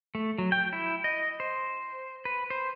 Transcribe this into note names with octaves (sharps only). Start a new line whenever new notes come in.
A3
F#3
G5
E4
D#5
C5
B4
C5